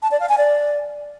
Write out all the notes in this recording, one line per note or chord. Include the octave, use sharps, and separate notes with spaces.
A5
D5
F5
G#5
D5